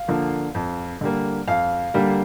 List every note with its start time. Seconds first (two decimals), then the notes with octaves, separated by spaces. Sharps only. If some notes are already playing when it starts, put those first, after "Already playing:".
Already playing: F5
0.08 D3 F3 A#3
0.54 F2
1.01 D3 G3 A#3
1.47 F2 F5
1.94 D3 G3 A#3